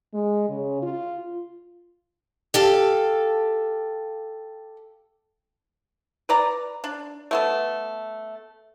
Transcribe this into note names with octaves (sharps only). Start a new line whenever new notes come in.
G#3
C#3
F4
G4 A4 F5
B4 D5 A#5
D4
A3 B3 A4